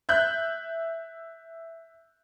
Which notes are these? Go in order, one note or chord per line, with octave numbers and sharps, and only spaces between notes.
E5 F#6 G6